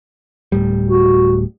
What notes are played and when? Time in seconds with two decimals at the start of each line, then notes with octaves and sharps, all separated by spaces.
0.52 D1 A2 G3
0.88 F#4